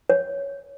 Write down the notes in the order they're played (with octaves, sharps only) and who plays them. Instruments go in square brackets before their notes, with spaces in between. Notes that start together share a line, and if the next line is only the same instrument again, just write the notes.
[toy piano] C#5